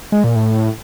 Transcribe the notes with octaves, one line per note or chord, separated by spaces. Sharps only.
G#3
A#2
A2